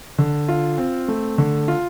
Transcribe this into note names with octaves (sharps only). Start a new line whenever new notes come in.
D3
F4
C4
A3
D3
F4